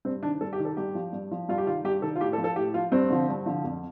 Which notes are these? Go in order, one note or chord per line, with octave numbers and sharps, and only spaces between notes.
G2 C4
D#3 D4
G2 A4
G4
D#3
A4
G2 G4
F3
G2
F3
G2 F4
G4
D#3 F4
G2 G4
D#3 A4
F4
A2 G4
A4
F3
A4
A2 G4
F3 F4
G2 C4
D3 F3
G2
D3 F3
F2